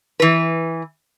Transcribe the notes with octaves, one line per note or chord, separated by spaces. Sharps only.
E3 B4